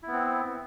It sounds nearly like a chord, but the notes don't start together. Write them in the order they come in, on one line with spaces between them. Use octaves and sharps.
E4 B3 C4